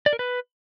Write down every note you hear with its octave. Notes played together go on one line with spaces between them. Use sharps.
D5
A#4
B4